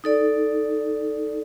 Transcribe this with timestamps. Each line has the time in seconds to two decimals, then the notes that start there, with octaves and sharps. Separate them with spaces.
0.04 D#4 A4 D5